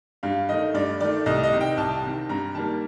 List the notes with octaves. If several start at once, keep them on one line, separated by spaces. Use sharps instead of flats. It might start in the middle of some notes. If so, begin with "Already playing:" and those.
G2 F5
D#3 A3 D#5
G2 D5
D#3 A3 D5
C2 D#5
D#5
C3 D#3
G5
C2 A5
C3 D#3
G2 A#5
D#3 G3 A#3 A5